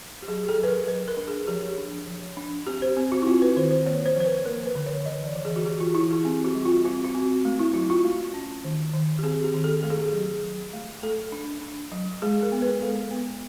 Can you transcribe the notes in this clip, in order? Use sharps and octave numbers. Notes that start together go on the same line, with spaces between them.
G4
F#3 G#4
A4
F#3 B4
A#4
F#3 B4
A#4
D4
G#4
F3 G4
D4
F3
D4
C4 G4
C5
C4 G4
F#4
E4
C4 F4
B4
D#3 C5
C5
A#3 C#5
C5
F3 C5
B4
A#3 A#4
B4
D3
C#5
E3 D#5
D5
E3
G#4
F#4
E3 G4
F4
E3 E4
G#4
C4 G4
F#4
G3
F4
C4 F#4
F#4
C4
A3
E4
F#3 F#4
F4
A3
C#4
D#3
D#3
G4
C4 G#4
G4
D#3
A4
A3 A4
G#4
G4
G#4
F#3
F#3
A3
A3 A4
D4
D4
F#3
G#3 G#4
A#4
B3
B4
G#3 A4
B3